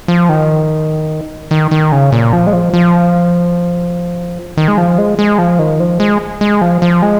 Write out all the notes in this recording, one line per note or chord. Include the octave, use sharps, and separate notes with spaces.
F3
D#3
D#3
D#3
C#3
A#2
F3
G#3
F3
F3
D#3
G#3
F3
G#3
G#3
F3
D#3
F3
G#3
G#3
F3
F3
G#3